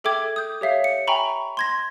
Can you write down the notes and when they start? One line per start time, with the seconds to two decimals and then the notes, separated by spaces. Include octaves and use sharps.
0.04 G#4 A4 E5 G5 D6 G#6
0.36 D#6 G6
0.61 G4 C#5 E5 F5
0.84 C#7
1.07 E5 G5 G#5 A#5 B5 C#6
1.57 C6 G#6 A#6